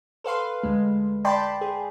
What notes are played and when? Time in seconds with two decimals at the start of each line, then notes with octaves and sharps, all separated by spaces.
0.24 A4 B4 F5 C6
0.63 D2 G#3
1.25 D5 G5 A5 B5 C6
1.61 G#4